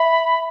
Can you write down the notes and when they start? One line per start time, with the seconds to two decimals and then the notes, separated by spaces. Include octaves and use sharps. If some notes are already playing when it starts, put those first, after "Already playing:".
Already playing: E5 B5